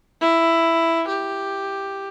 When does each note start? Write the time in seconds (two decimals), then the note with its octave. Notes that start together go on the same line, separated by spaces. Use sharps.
0.21 E4
1.07 G4